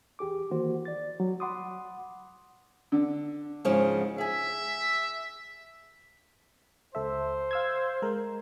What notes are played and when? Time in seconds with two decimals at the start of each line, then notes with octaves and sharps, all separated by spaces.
0.19 E2 G4 G#4 D6
0.50 D#3 E3 A#3 F#4 C5
0.85 D5 A6
1.20 F#3
1.40 F#5 B5 C6 D6 D#6
2.92 D3
3.65 G#2 C#3 F3
4.18 G#4 E5 G#5
6.95 C#2 A4 C5 E5
7.51 F5 E6 G#6
8.02 G#3 A#4